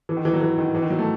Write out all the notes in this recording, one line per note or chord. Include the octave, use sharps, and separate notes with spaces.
E3
D#3
E3
F#3
E3
D#3
E3
D#3
F#3
A3